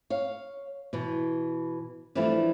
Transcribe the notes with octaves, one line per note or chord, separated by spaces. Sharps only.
C#5 F5
B2 E3
E3 F3 G3 A3 D4 E4